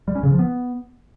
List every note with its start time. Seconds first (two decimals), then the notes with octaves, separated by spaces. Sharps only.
0.08 G3
0.15 C#4
0.23 C#3
0.31 F3
0.39 B3